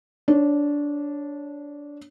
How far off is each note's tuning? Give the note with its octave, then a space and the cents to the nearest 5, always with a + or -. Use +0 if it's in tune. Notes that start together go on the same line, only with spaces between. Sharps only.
D4 -15 C#5 +0